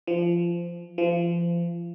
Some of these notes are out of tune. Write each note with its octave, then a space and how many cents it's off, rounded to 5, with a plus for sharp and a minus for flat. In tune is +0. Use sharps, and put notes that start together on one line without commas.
F3 -20
F3 -30